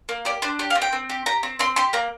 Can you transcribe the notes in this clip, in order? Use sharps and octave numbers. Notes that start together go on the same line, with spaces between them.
A#3
G4 D5
D4 C5
G4 D5
F5
C4
G5
C4
G4
G4 A#5
C4
C4 C6
G4 C6
A#3 A#5